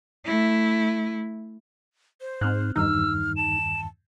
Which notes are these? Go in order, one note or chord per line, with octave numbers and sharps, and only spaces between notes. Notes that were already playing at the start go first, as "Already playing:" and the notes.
A3 E4
C5
G#2 C4 F6 F#6
E2 G2 D#3 D#4 E6 F6
A5 E7